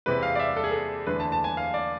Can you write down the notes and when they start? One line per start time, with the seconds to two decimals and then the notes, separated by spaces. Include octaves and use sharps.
0.06 E2 C3 E3 G#3 B4
0.23 F5
0.35 D5
0.39 E5
0.57 A4
0.64 G#4
0.72 A4
1.07 E2 D3 A3 B4
1.20 A5
1.32 A5
1.44 G#5
1.57 F5
1.74 D5